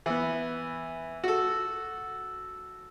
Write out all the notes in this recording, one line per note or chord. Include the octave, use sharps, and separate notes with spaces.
E3 B3
F#4 A4